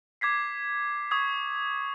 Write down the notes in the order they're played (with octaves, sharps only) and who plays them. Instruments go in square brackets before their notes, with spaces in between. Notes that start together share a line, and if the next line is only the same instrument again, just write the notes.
[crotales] D6 G#6 B6 C7
C#6 D#6 G#6